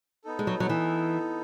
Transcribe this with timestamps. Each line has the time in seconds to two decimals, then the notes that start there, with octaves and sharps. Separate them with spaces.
0.24 B3 D#4 A4
0.39 G#3
0.47 F#3
0.60 F#3
0.69 E3